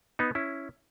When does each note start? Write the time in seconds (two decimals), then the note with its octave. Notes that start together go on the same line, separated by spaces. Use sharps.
0.19 B3 D#4
0.35 C#4 E4